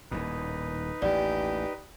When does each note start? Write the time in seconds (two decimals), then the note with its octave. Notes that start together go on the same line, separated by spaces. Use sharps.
0.11 D#1 D#2 A2 D#4 B4
1.02 A1 D#2 G4 D5